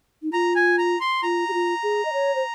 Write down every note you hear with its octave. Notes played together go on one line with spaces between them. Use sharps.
D#4
F4 A#5
G#5
A#5
C6
F4 A#5
G4
F4
G#4
D#5
C#5
C5